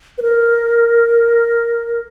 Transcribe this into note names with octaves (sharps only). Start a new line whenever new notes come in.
B4
A#4